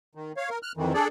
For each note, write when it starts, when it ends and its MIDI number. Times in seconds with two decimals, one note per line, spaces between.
0.15 0.32 51
0.37 0.49 73
0.37 0.49 77
0.50 0.59 70
0.63 0.72 89
0.63 0.72 90
0.77 0.93 41
0.77 0.93 51
0.77 0.93 52
0.94 1.08 62
0.94 1.08 68
0.94 1.08 69
0.94 1.08 74